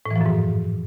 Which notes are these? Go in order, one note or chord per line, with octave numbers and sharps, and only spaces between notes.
A2
E3
F3
F#2
G#2